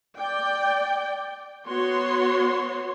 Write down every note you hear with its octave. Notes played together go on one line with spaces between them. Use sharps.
D5 G5
B3 F#4 C#5 C6